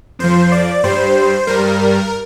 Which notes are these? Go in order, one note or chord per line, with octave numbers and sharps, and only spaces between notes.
F2 F3 C5
D5
G2 G3 C5
G2 G3 A#4